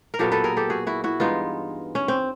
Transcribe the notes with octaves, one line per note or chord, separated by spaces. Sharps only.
A#4
A#2 F#3 B3 G4 A4
A4 B4
G#4 A#4
G4 A4
F#4 G#4
E4 F#4
E4 F#4
G2 E3 G#3 B3 D#4 F4
C#4
C4